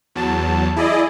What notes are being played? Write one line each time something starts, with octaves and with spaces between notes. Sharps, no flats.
E2 F#3 A5
E4 G#4 D5 D#5